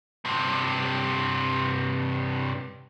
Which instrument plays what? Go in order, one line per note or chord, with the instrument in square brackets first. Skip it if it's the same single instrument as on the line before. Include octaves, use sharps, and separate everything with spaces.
[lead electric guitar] G2 C3